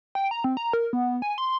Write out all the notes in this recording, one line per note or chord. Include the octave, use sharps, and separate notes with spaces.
G5
A#5
C4
A#5
A#4
B3
G#5
C6